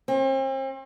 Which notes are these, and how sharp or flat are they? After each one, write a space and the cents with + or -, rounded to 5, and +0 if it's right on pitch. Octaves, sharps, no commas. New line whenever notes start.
C4 +40